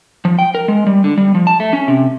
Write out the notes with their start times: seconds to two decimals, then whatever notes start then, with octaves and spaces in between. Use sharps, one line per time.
0.25 F3
0.39 G5
0.55 A#4
0.68 G#3
0.87 G3
1.04 D3
1.18 G3
1.35 F3
1.47 A5
1.60 A3
1.73 C#4
1.88 C3